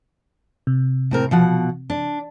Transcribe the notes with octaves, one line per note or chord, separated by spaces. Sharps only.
C3
A2 C4 A#4
B2 F3 F#5
D4